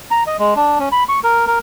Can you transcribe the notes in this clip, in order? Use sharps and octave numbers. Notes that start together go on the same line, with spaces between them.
A#5
D#5
G#3
D4
C#4
B5
C#6
A#4
A#4